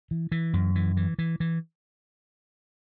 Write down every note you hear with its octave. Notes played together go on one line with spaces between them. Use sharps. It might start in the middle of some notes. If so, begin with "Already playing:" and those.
E3
E3
F#2
E3
E3
E3
E3